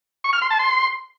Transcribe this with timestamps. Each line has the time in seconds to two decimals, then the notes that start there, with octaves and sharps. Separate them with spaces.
0.24 C#6
0.33 F6
0.42 C6
0.50 A5
0.59 C6